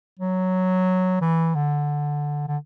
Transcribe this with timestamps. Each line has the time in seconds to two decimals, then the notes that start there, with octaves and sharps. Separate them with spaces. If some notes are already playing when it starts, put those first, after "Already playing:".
0.19 F#3
1.21 E3
1.55 D3
2.48 D3